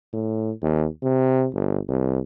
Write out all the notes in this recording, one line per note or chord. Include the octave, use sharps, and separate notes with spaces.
A2
D#2
C3
G1
C2